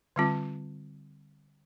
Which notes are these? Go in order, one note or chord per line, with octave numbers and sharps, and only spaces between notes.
D3 G3 C4 F4